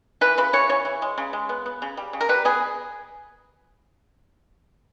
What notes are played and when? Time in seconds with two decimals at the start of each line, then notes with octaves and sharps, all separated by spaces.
0.21 E3 B4
0.38 C#3 B4
0.53 E3 C#5
0.69 C#3 C#5
0.85 E3
1.02 G#3
1.18 C#3
1.33 G#3
1.49 B3
1.66 B3
1.82 C#3
1.97 G3
2.13 C#3
2.21 A#4
2.29 G3 B4
2.45 B3 G#4